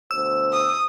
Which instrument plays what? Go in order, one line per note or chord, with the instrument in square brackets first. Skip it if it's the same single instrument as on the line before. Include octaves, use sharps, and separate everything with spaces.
[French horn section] D2 B2 C5 [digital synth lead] E6
[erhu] D#6